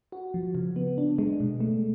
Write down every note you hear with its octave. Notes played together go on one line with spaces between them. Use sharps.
F#4
F3
C#3
B3
D4
G#3
B2
A3